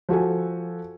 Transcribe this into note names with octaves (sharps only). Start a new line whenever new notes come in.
F3 F#4 A4 G#5